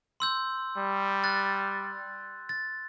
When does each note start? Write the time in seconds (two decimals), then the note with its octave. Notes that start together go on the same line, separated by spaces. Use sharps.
0.20 C6 E6 G6
0.77 G3
1.24 F#6 A6
2.49 A6